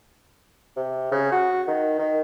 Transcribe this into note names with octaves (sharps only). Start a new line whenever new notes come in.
C3
C#3
F#4
D#3
D#3